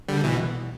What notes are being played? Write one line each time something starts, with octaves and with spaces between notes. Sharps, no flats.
D3 G3
B2 E3